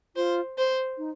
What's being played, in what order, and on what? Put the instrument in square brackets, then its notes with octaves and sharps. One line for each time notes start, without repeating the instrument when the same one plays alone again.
[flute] F4 [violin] C5
[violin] C5
[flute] D#4